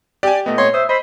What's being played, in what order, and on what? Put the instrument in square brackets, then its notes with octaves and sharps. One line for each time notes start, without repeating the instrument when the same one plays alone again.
[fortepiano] G4 [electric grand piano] D5 G#5
[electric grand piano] A#2 A3 B3 [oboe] D#5
[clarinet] C#5 [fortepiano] C6
[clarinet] C5 [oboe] E5 [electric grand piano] D#6
[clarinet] C5 [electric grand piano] D#5 [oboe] B5